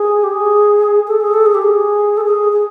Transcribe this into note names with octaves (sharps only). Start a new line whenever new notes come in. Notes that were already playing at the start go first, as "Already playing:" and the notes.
Already playing: G#4
G4
G#4
A4
G#4
A4
G#4
G4
G#4
A4
G#4
G#4